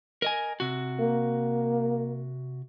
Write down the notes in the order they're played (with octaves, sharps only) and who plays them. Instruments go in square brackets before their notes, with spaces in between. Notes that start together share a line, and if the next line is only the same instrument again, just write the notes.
[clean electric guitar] A#4 D#5 G#5
C3 F#4
[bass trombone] A#3